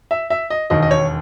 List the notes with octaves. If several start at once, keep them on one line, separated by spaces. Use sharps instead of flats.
E5
E5
D#5
E1 D#2 D#3 D#5
D#5
C#5